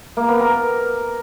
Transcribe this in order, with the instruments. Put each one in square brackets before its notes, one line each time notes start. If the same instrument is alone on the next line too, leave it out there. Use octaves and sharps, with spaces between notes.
[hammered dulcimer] A#3
B3
A#4